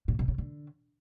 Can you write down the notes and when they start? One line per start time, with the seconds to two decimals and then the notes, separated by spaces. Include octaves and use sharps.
0.08 A#2
0.19 B2
0.28 C#3
0.38 D3